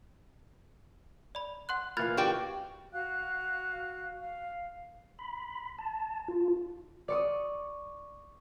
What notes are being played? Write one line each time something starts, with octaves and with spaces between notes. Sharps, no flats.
D5 B5
F#5 C6 F#6
A#2 E3 F5 B5 F6 F#6 G#6 A6
F#4 G4 D5 G5
F#4 F5 F#6
F5
B5
A5
F4
D5 C#6 D#6